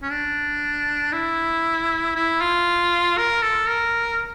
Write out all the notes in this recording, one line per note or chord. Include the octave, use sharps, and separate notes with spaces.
C#4
D4
E4
E4
F4
A#4
A4
A#4